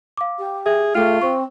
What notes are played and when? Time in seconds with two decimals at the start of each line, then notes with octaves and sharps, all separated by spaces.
0.17 F5 D6
0.38 G4
0.66 G#4 E5
0.95 A3 F4 G#4 G5 F6
1.22 C4 C5 C#6